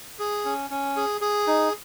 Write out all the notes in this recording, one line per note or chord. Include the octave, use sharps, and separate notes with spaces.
G#4
C#4
C#4
G#4
G#4
D#4